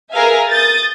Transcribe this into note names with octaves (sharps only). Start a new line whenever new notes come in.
G#4 A#4 B4 E5 F5 G#5
D#6 G6 A6